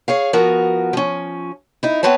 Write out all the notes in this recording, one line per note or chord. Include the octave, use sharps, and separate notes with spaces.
G#4 C#5 F5
F3 B3 F#4 A#4
F3 C#4
D#4 E4
B3 C4 B4 C#5 A5